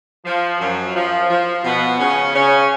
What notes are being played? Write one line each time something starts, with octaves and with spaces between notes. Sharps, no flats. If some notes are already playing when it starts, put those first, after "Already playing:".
F3
F#2 F#3
F3
F3
B2 B3
C#3 C#4
C#3 C#4